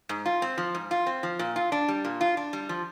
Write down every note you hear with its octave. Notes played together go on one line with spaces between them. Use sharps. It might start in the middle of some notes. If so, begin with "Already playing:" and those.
G#2
F4
C4
F3
G#2
F4
C4
F3
A#2
F4
D4
G3
A#2
F4
D4
G3
F3